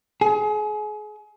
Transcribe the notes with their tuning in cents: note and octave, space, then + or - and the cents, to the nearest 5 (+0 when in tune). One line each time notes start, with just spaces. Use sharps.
G#4 +30